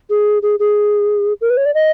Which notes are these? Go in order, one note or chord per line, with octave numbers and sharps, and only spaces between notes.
G#4
G#4
G#4
A#4
B4
C#5
D5
D#5